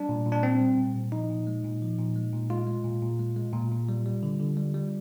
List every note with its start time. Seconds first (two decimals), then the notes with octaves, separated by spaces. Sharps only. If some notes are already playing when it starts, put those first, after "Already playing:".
Already playing: G3 D4
0.09 A#2
0.26 A#2
0.32 D4
0.43 G3 C4
0.60 G3
0.78 A#2
0.95 A#2
1.12 F3 D#4
1.30 A#2
1.47 G#3
1.64 A#2
1.82 F3
1.98 A#2
2.16 G#3
2.33 A#2
2.50 G#3 F4
2.67 G#3
2.85 A#2
3.02 A#2
3.19 G#3
3.36 G#3
3.53 A#2
3.71 A#2
3.89 G3
4.06 G3
4.23 D3
4.40 D3
4.57 G3
4.75 G3